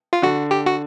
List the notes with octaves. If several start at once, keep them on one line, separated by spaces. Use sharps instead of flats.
F4
D3 F#4
G4
F#4